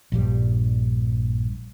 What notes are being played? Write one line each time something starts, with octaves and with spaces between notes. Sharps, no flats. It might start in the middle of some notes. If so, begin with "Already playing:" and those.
A#1 G2 G3